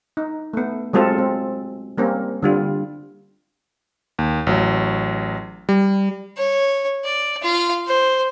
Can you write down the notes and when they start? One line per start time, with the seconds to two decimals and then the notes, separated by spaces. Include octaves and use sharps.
0.17 D#4
0.53 A3 B3
0.93 F#3 G#3 C4 F4 A4
1.18 C4
1.98 G3 A#3 C4 C#4
2.43 D3 G3 F4
4.19 D#2
4.47 A1 F#3
5.69 G3
6.37 C#5
7.05 D5
7.42 F4 F5
7.87 C5